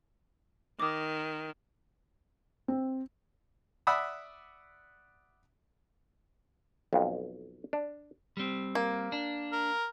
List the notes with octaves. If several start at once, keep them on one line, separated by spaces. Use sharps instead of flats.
D#3 D6 D#6
C4
D5 E5 F#5 B5 D#6 E6
B1 F2
D4
G3 C4
A#3
D4
A#4